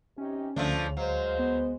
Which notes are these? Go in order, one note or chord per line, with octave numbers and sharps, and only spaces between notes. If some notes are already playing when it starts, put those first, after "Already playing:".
C3 C#4 D#4 G4
D2 C#3 F3 A3 D4
F#3 G#3 C5 F5
B3